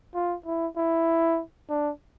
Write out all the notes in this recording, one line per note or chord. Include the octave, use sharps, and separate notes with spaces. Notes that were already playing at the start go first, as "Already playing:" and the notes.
F4
E4
E4
D4